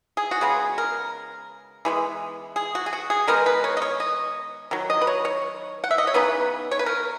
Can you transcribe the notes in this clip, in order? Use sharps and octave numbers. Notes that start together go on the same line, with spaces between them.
G#4
F#4
C#3 G#3 B3 G#4
A#4
E3 G#3 B3
G#4
F#4
G#4
F#4
G#4
D#3 G#3 B3 D#4 A#4
B4
C#5
D#5
C#5
D#5
D#3 F#3
D#5
B4
C#5
C#5
F#5
E5
D#5
C#5
C#3 E3 B3 D#4 B4
C#5
B4
A#4